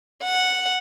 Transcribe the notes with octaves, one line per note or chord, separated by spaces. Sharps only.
F#5